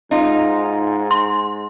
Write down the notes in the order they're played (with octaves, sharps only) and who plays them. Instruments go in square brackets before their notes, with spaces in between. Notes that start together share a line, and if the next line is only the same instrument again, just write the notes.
[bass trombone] G#2 [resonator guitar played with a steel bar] D#4 F4
[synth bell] C6